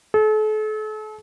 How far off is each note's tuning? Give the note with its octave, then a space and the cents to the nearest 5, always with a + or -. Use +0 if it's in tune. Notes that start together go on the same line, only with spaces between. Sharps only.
A4 -40